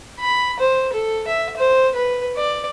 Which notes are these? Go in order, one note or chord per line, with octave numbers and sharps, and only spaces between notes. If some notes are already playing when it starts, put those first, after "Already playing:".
B5
C5
A4
E5
C5
B4
D5